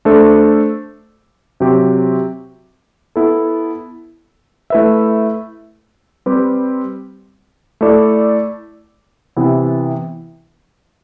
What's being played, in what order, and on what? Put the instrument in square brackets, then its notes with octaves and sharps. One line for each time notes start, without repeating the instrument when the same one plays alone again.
[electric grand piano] A3 D4 A4 C5
C3 F#3 C4 G4
B3 E4 A4
A3 E4 B4 E5
G3 C4 G4 B4
A3 E4 A4 D5
C3 E3 B3 E4